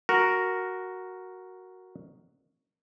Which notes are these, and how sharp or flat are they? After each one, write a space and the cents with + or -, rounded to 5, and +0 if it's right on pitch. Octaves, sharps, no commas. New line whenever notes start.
F#4 +0 A#4 +0